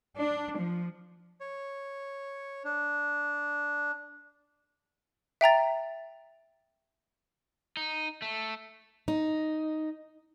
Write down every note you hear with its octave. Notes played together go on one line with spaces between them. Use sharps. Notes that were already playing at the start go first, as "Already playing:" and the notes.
D4
F3
C#5
D4
E5 G5 A#5 A6
D#4
A3
D#4